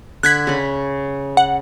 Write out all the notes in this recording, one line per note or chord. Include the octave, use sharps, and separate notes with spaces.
D3 F#6 G#6 B6
C#3 B5
F#5